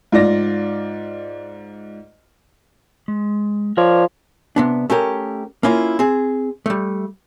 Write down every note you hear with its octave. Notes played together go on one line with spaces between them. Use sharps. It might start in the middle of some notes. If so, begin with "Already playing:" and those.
G#2 F4 D5 A#6
G#3
F3 A#4 C#5 D5
C3 B3 D4
A3 C#4 G4 A#4
A#3 C#4 E4 F4
C4 G#4
G3 A3